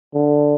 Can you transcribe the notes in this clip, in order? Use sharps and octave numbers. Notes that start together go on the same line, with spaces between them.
D3